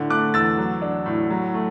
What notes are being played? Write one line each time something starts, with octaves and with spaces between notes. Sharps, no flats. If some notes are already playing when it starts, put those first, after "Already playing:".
Already playing: A2 D3
A3 D6 F#6
E2 E6 A6
F#3
D4
A2
F#3
A3